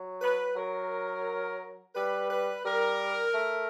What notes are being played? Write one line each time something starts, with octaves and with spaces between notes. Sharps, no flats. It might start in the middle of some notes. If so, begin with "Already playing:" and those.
Already playing: F#3
B4
F#3 A#4
G3 B4
B4
G3 A#4
A3